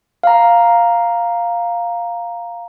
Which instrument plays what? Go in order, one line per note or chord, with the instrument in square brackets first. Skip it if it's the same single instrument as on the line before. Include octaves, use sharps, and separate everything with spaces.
[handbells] F5 A#5